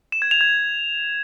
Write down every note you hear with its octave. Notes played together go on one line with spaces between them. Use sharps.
E7
G#6
F7
G#6